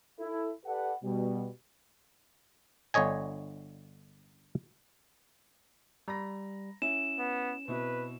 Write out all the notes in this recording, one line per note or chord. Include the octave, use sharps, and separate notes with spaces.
E4 A4
G4 A4 B4 D5 F#5
B2 G3
G1 D3 C#5 D#5 G#5
G3 A#5 B5 A#6
C#4 E4 E7
B3
B2 C4 E4 B4